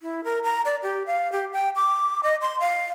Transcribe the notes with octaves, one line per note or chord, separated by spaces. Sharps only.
E4
A#4
A#5
D5
G4
F5
G4
G5
D6
D#5
C6
F5